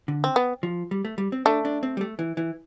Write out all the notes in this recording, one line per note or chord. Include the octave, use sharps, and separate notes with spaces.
D3
C4
B3
F3
G3
A3
G3
C4
A3 D4
D4
C4
G3
A3
E3
E3